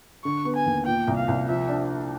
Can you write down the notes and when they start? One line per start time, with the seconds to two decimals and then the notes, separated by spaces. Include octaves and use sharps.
0.24 D3 C#6
0.45 B3
0.56 G#5
0.66 D#2
0.86 A#2 G5
1.07 C2
1.17 F5
1.28 C2
1.48 F3 E5
1.69 D4